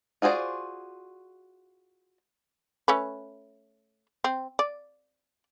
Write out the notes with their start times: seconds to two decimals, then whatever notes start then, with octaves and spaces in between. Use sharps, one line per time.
0.22 F4 F#4 G#4 C5 D5
2.88 A3 C#4 B4
4.24 C4
4.59 D5